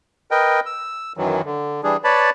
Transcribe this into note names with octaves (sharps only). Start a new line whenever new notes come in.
A#4 B4 D#5 G5
E6
F#2 D#3 E3 F#3
D3
E3 G3 D4 G#4
B4 C#5 D5 A5 B5